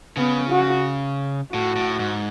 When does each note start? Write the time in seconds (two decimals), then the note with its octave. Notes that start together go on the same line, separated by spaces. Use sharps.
0.17 C#3 B3
0.51 F#4
1.53 A2 F#4
1.76 A2
1.99 G#2